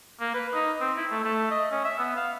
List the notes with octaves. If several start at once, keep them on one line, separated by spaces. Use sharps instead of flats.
A#3
B4
D#4
C4
E4
A3
A3
D#5
C#4
E5
B3
F5